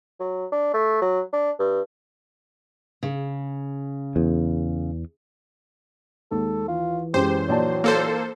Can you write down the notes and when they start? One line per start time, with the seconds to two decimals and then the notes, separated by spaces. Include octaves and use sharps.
0.20 F#3
0.52 D4
0.74 A3
1.02 F#3
1.33 D4
1.60 G2
3.03 C#3
4.16 E2
6.31 D#2 G#3 A4
6.68 E3 F4
7.14 F#2 G#3 G4 C5
7.48 A#1 F#3 D5 A5
7.84 A#3 A4 C5